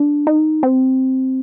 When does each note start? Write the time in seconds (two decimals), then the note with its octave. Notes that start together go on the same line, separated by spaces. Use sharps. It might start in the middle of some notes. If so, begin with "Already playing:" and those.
Already playing: D4
0.27 D#4
0.63 C4